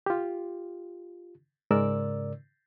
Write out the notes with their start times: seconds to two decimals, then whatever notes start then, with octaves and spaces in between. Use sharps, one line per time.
0.06 F4 G4
1.71 G#2 C#3 G#3 A#4 D5 E6